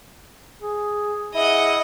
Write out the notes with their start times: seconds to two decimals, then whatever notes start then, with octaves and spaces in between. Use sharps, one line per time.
0.62 G#4
1.34 E4 G#4 D#5 F#5